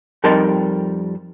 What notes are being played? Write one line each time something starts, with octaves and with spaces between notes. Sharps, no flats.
F2 G3 D#4 A#4 A5 C6